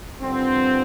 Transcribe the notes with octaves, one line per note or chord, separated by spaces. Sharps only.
G2 D3 F3 C4